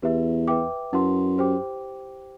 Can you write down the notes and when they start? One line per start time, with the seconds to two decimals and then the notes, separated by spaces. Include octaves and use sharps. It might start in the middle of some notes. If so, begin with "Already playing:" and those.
0.02 E2 G4 B4 E5
0.48 B4 E5 G5 D6
0.93 F#2 E4 B4 F#5 C6
1.38 G4 C5 G5 D6